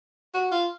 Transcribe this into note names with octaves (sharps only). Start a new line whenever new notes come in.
F#4
F4